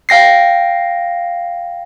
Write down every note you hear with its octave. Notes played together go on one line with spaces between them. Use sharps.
F5 G5 A#6 C7